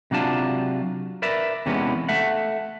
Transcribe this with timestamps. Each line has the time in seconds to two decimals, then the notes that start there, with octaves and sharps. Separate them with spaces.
0.11 C3 F#3 D4 F4 A5
1.22 A#4 B4 D5 E5
1.66 E2 C3 E3 G#3 B3 C#4
2.09 A3 E5 F#5